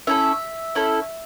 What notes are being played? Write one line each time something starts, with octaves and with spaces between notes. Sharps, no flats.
C#4 E4 A4 E5
C#4 E4 A4